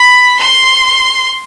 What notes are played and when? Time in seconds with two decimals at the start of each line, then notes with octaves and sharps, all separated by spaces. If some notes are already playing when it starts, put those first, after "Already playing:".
Already playing: B5
0.39 C6